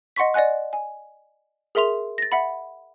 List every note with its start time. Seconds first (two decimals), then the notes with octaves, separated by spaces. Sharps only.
0.16 D#5 F#5 C6 C#6 B6
0.34 D5 D#5 F#5 G#5 F#6
0.73 G#5
1.75 G#4 A#4 E5 C6 F7
2.18 A6 A#6
2.32 E5 F#5 B5